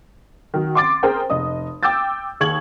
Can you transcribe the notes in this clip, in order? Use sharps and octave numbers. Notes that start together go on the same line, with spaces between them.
D#3 F#3
C6 D6 A6
G#4 A#4 C5 G5
F1 D#5 D#6
G5 D6 E6 G6 A6
D#2 G#4 C#6 G#6 F#7